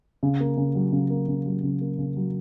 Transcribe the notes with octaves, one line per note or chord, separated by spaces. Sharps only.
C#3
A#3
C#3
F#3
C#3
A#3
C#3
F#3
C#3
A#3
C#3
F#3